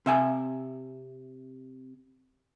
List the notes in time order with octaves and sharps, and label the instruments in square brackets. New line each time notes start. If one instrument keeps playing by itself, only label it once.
[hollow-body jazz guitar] C3 E5 G#5